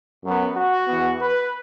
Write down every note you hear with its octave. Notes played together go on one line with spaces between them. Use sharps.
F#2 F#3 B3
F#4
E2 E3 B3
B4